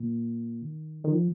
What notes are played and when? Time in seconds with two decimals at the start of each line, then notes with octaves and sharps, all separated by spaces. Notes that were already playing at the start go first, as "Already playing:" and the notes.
Already playing: A#2
0.62 D#3
1.04 D#3
1.11 F3